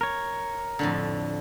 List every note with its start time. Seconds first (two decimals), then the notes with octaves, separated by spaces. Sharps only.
0.01 A#4 C#5
0.79 F2 A2 D3